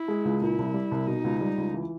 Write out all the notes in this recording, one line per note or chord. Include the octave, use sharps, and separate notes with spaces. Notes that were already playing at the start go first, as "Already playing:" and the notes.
Already playing: E4
G#3
C#2
A#2 E4
C2
G3
C2
B2 D#4
C#2
G3
C#2
E3